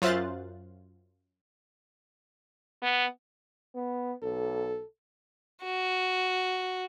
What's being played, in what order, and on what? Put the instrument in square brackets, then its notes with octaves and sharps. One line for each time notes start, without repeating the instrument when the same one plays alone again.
[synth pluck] F#2 F4 C5 E5 F#6 A6
[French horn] B3
[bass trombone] B3
[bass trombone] B1 [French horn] A4
[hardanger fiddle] F#4